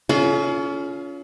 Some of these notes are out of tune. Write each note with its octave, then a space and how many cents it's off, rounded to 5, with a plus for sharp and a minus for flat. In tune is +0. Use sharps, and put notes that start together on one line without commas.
C#4 +30 F4 -5 A4 -45